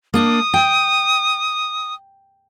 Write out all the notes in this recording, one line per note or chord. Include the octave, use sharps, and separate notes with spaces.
A#3 D4 D#6
G5